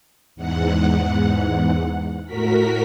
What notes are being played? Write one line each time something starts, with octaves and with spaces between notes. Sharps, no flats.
E2 G#2 F#5
A2 F#4 A#4 B6